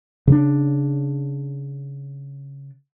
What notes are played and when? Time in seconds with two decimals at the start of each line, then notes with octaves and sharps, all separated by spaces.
0.27 C#3 D4